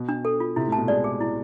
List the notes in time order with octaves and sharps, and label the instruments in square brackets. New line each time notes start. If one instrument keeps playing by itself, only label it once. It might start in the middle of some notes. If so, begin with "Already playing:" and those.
Already playing: [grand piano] B2
[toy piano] D4
A4
F4
[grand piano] C3 [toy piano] E4
[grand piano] A2
[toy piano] A5
[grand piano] B2
[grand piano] G#3 [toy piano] D5
[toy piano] G#4
E4